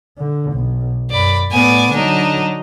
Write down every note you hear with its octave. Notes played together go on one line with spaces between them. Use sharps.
D3
B1
F#2 D5 B5
A2 B3 D5 G#5
D3 F#3 D4 D#4